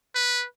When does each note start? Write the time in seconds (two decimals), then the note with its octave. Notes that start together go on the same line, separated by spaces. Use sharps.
0.15 B4